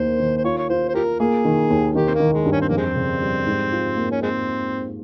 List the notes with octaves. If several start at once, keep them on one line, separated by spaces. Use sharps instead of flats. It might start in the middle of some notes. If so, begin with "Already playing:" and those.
Already playing: D#2 A#3 C5
D#3
C5
F4 C#5
C#5
F4 C5
C5
F4 G4 A#4
A#3 G#4
D#3
D#2
D#3 G4
C4
A#3
D#3
G#3
G2
C#4
C4
F2 A#3
G#3 C4
C#3
G3
G#2
F4
A#3
C#4
G#3 C4